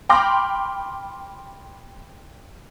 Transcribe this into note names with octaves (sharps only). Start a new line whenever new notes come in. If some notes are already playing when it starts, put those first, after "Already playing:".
G5 B5 C6 D6 F6 A#6